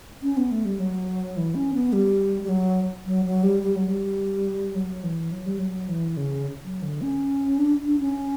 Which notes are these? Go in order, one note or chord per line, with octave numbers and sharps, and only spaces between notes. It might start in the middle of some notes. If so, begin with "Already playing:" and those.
C#4
B3
A3
G3
F#3
E3
C#4
B3
G3
G3
F#3
F#3
F#3
G3
G3
F#3
G3
F#3
E3
F#3
G3
F#3
E3
C#3
F#3
D3
C#4
D4
D4
C#4